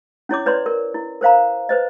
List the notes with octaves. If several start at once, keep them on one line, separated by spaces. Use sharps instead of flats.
C#4 E4 C#5 D6
E4 B4 C#5 D5 C6
A#4
E4
A#4 C5 F5 A#5
B4 C5 D#5